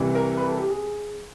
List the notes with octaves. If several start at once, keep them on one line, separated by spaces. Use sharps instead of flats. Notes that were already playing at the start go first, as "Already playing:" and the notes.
Already playing: C2 C3 E3
A#4
B4
A4
G4
G#4